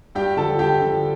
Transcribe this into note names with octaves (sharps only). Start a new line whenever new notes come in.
G2 G4 G5
D3 F3 A4 A5
G2 G4 G5
D3 F3